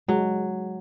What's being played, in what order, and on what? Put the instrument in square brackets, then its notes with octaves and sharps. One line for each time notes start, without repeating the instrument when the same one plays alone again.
[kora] F#3 [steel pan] G#3